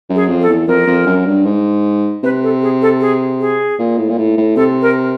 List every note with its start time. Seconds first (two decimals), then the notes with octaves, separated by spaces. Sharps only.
0.09 F#2
0.15 G#4
0.28 F2
0.42 A4
0.48 E2
0.67 F2 A#4
0.87 F2
1.06 F#2
1.26 G2
1.46 G#2
2.23 C3 B4
2.43 A4
2.63 G#4
2.82 A4
3.01 G#4
3.40 G#4
3.79 A#2
3.98 A2
4.09 A#2
4.18 A2
4.37 A2
4.56 C3 A4
4.82 A#4